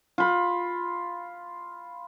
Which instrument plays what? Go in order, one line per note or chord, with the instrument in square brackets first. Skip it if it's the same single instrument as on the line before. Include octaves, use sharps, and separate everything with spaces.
[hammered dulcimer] F4 B5